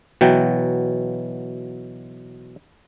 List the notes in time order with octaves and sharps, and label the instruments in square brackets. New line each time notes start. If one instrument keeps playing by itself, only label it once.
[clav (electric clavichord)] B2 E3 F#3 G5